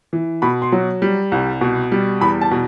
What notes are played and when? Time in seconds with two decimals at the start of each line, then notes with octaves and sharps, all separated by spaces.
0.13 E3
0.42 B2 B5
0.62 C6
0.72 F#3
1.02 G3
1.32 C2
1.61 B2
1.92 G3
2.21 E2 B5
2.41 A5
2.51 B2